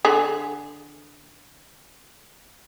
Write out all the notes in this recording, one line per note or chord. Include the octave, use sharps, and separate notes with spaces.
D3 G#4